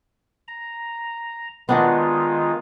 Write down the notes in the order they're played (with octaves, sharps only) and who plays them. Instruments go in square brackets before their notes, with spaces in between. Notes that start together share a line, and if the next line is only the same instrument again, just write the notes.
[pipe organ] A#5
[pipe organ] D#3 G#3 F4 [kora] B3 D4 F#4